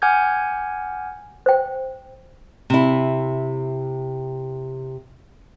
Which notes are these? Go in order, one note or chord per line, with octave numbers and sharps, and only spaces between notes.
F#5 G#5 D6 F6 G6 G#6
C5 G5
C3 E4